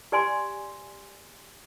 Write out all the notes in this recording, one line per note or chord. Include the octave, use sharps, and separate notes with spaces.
G4 D5 G#5 C6